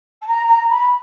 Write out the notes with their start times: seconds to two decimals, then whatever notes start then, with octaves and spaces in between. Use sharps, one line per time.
0.21 A5
0.27 A#5
0.48 A#5
0.69 B5